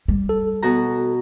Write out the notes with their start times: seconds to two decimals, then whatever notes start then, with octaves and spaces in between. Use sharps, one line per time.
0.08 G3
0.29 A4
0.63 B2 F#4 A#5